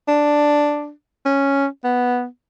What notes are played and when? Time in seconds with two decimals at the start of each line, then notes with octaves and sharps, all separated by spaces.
0.08 D4
1.25 C#4
1.84 B3